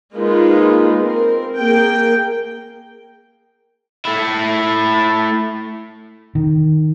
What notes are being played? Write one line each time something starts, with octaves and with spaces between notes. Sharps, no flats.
G#3 A#3 D#4 F4 B4
C4 A#4
A#3 G#4 A#4 G5
A3 E4
D#3